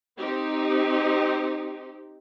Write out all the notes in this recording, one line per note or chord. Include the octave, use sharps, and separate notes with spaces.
C4 D#4 G4